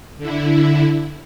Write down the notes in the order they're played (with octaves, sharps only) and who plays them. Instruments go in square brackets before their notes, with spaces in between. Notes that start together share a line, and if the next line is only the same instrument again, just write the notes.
[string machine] D3 E4